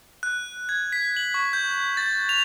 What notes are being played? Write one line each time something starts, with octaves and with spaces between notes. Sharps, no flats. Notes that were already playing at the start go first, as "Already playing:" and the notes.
F#6
G#6
B6
F#7
C#6
G6
A6
F7